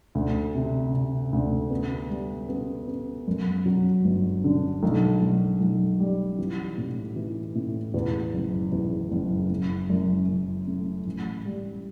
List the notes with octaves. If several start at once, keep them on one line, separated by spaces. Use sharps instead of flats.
D2
C3
C3
D2
B3
G3
B3
B3
F#2
F#3
G1
D3
B1
B1
B1
G3
E3
A2
E3
A2
E2
F#1
E2
F#1
F#1
F#2
F#1
A3
A1
G3